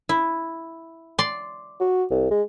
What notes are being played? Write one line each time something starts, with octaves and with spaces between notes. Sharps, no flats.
E4
D5 C6
F#4
C2
G#3